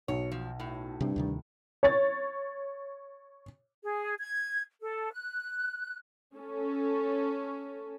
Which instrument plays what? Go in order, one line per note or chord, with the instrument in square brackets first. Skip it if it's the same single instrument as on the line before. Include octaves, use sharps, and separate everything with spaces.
[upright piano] B1 [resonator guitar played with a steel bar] C#5
[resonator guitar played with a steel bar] F3
A2
[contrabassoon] G2 [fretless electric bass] C3 C4
[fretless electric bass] D2 C3 D#3
[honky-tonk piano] C#5 A6
[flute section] G#4
G#6
A4
F#6
[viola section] C#4 A4